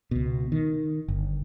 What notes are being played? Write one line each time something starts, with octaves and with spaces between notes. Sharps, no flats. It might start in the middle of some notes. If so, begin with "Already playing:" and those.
C#2 B2
D#3
G1